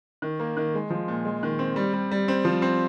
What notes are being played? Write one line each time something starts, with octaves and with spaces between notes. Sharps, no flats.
D#3
A#3
D#3
G#3
F3
A#2
G#3
D#3
C4
G3
G3
G3
C4
F3
C4